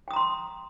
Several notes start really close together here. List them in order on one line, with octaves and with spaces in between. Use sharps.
G5 D#6 A#5 C6